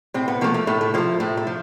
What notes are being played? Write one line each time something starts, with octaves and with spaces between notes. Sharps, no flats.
A2 C4
B3
F3 A3 A#3
A3
A2 A3
A3
F3 A3 A#3
A2 A3
A3
F3